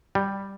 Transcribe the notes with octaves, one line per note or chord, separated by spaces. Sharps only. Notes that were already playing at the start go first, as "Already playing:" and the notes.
G3